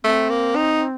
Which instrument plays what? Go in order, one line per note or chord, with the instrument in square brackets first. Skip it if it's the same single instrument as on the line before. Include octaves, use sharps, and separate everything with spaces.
[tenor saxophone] A3 [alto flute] C4
[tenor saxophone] A#3
D#4